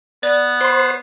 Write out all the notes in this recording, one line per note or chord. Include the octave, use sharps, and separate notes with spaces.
B3 D5
C5 B5